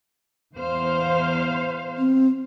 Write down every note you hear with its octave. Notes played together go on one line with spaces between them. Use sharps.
E2 C5 F5
C4